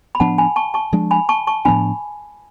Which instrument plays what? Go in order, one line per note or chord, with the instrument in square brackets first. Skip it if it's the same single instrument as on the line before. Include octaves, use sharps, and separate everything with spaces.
[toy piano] B5
[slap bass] A2 F3 B3 D4 [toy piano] F#5 A5
[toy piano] G#5 B5
A5 C#6
A5 C#6
[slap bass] F3 G#3 D4
[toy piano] G#5 B5
A5 C#6
A5 C#6
[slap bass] A2 F3 B3 D4 [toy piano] G#5 B5